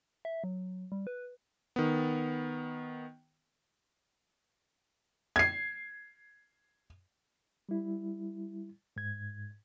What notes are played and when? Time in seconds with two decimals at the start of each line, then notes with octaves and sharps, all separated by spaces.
0.25 E5
0.44 F#3
0.92 G3
1.07 B4
1.76 D#3 B3
5.36 G#6 C7
7.69 G3 E4
8.96 G#2 G#6